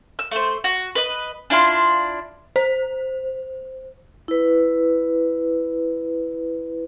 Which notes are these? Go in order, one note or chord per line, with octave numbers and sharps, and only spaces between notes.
E6
A3 C5
F#4
B4 D#5
D4 E4 F4 C6
C5
E4 B4